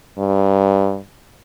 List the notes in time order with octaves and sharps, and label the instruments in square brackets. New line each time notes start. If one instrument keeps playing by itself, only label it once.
[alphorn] G2